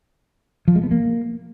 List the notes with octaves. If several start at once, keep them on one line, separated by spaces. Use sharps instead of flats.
F3
G#3
B3
A#3